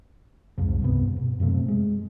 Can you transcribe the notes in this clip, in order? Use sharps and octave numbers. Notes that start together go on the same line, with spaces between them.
C2 F2 G#2 F3
C2 G2 C3 B3
B2
F#2 C3 A3 C4
G#3